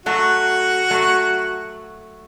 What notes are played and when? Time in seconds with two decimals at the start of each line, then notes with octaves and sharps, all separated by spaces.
0.06 F#3 A3 F#4
0.90 F#3 A3